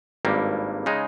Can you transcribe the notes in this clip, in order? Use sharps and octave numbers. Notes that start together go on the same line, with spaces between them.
G#1 G2 G3 A#3
C#3 G#3 D#4